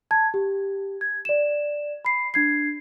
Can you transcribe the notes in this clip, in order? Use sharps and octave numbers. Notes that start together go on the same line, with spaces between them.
A5 G#6
G4
G#6
D5 E7
B5 C7
D4 G#6 C7